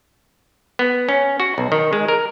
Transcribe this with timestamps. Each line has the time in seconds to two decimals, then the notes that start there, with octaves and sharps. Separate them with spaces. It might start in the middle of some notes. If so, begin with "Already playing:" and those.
0.79 B3
1.09 C#4
1.40 F#4
1.58 B1
1.72 D#3
1.93 G#3
2.08 A#4